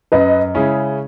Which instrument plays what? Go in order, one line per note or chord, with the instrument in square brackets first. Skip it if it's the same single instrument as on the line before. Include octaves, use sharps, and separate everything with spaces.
[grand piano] F#2 [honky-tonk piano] B4 D#5
[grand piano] C#3 G#3 C#4 E4